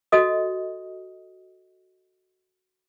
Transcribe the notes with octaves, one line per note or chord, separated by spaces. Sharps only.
F#4 A4 D#5 D#6